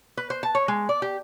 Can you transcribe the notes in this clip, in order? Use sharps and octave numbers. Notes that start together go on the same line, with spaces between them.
B4
C5
A5
C#5
G#3
D5
G4